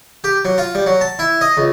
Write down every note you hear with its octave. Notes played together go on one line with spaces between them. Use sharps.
G4
F#3
F4
G3
F#3
A5
E4
D#5
C#2